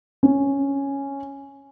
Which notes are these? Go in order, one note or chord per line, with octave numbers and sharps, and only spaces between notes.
C#4